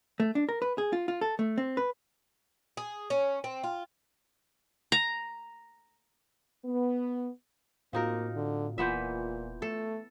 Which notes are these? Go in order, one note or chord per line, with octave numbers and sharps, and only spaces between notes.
A3
D4
A#4
B4
G#4
F4
F4
A4
A3
C4
B4
G#4
C#4
C4
F4
A#5
B3
A2 A#3 C4 D#4 F4 F#4 A#4 F5
D3
D#1 A#2 E3 B3 F4 E5 C6 G6
A3 A4